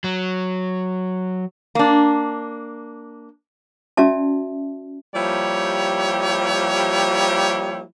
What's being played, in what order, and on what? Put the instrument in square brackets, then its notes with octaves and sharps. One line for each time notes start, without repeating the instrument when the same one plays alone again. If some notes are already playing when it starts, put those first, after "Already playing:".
[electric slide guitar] F#3
[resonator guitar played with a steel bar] A#3 D4
[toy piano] C#4 F#4 D5 E5 A5
[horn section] F3 G3 A#3 E4 G4 C#5